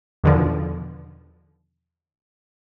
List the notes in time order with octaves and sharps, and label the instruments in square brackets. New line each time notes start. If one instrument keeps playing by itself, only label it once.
[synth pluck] E2 B2 D3 D#3 F3